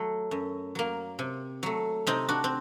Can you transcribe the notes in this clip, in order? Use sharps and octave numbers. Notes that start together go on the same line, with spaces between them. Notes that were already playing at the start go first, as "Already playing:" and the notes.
Already playing: F#3 A3
F#2
F#3 A#3
C3
F#3 A3
C3 C4 D#4
D4 F#4
C4